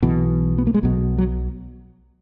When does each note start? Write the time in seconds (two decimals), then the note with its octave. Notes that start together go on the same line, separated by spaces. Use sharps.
0.03 B1 B2 E3
0.58 B3
0.67 A#3
0.74 G#3
0.83 B1 B2 F#3
1.18 F#3